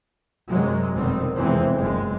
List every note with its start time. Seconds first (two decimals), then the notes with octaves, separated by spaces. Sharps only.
0.49 F#2 C3 F#3 G#3
0.94 F1 B2 D#3 G3 C4
1.37 F1 E2 E3 G#3 C4
1.78 F#1 F#2 G#3